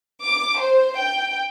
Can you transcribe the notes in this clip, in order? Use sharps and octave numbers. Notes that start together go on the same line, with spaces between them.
D6
C5
G5